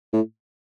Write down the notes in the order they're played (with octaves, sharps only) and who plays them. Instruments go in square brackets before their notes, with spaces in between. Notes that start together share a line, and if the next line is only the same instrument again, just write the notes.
[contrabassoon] A2